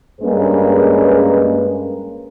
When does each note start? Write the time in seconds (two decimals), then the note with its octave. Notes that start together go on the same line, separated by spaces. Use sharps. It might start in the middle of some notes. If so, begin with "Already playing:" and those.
0.21 G2 G#3 A#3 C#4 G#4 B4